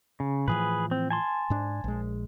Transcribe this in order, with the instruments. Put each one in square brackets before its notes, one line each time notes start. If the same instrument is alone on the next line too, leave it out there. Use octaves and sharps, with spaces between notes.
[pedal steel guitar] C#3
[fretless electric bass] A2 E3 F3 [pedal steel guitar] G#4 B4
[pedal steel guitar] C4
G#5 A5 C6
[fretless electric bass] G#2 D4
A#1 G#3